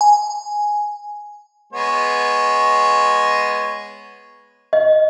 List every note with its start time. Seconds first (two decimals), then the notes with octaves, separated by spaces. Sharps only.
0.01 G#5
1.73 G#3 B3 C#5
4.73 D#5